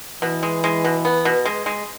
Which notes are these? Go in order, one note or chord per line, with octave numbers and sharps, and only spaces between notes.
B2 E3
G#3
G#3
B2
B3
B2
G#3
G#3